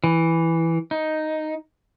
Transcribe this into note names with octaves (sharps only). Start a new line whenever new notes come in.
E3
D#4